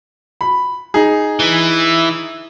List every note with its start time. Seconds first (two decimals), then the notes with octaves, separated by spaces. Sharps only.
0.41 B5
0.94 D#4 G#4
1.40 E3